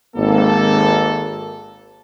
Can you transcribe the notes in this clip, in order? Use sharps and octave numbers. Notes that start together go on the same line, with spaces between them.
G#1 A#3 A4